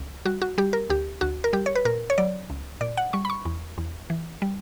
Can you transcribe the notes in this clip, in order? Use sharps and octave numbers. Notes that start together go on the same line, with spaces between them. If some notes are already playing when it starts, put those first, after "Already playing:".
Already playing: C#2
G3 F#4
F#4
G3 G4
A#4
D2 G4
D2 F#4
A#4
G3 G4
C#5
B4
A#2 A#4
C#5
F#3 D5
C#2
A#2 D5
F#5
G3 C#6
B5
C#6
E2
E2
E3
G3